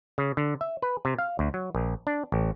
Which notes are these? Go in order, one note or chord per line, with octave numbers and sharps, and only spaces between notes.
C#3
D3
E5
B4
C3
F5
D2
F#3
A#1
D4
A1